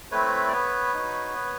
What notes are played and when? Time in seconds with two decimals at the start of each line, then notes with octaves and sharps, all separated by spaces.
0.12 A3 C4 E4 B4 C#5
0.48 D5
0.52 B3 B4 C#5
0.94 D#4 F#4
1.34 B3